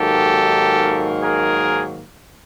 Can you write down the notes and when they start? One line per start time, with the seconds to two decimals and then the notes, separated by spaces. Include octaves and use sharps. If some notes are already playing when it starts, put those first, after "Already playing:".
Already playing: G#2 D#3 F#3 A#3 G4 A4
1.21 G#4 A#4